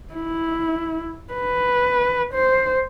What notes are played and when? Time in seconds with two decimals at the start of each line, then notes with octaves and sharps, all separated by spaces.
0.14 E4
1.34 B4
2.34 C5